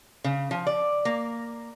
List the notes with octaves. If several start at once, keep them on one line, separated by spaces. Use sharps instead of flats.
C#3
F3
D5
A#3